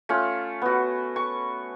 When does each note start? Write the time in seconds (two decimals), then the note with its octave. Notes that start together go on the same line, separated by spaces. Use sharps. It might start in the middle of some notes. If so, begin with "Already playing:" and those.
0.09 A3 C#4 F4
0.62 B3 F#4
1.16 C#6